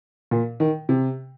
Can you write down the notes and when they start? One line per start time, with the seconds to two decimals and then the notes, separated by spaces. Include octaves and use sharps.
0.31 A#2
0.60 D#3
0.89 C3